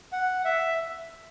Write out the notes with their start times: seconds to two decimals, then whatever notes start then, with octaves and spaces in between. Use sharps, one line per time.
0.12 F#5
0.45 E5